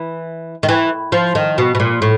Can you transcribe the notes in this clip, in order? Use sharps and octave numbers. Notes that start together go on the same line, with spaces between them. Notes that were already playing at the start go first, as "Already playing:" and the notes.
Already playing: E3
D#3
E3
F3
D#3
B2
B2
A#2
A2